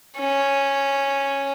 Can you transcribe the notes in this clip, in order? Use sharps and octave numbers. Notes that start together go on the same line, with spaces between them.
C#4